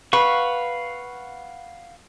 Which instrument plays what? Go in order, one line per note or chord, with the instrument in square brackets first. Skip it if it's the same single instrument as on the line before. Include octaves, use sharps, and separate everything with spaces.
[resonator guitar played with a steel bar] B4 [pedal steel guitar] F5 F#5 C#6